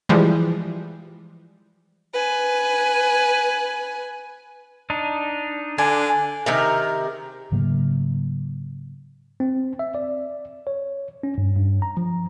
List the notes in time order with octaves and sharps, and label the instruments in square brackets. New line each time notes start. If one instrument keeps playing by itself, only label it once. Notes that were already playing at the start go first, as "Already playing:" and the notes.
[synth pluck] E3 F3 G3 G#3
[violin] B4 G#5
[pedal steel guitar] D4 D#4
[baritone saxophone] D3 [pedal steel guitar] D4 [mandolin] G#5
[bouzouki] C3 D#3 A#4
[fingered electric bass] G#2 C#3 F#3 A#3
[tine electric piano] C4
E5
D5
C#5
C#4
G2
G2
A#5
F3